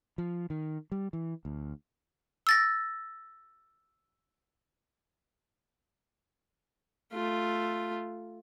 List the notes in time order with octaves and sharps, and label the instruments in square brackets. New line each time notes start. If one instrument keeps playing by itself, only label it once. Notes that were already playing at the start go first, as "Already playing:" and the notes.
[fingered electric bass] F3
D#3
G3
E3
D2
[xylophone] E6 A6 A#6
[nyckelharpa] A3 F4